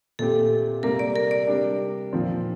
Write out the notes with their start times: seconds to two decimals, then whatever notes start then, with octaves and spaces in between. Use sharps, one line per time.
0.19 A#2 A3 C4 G4 A4
0.83 C3 G3 A#3 A#4
0.99 D5
1.16 A#4
1.31 D5
1.47 C3 G3 D4
2.13 A#2 F3 C4 F4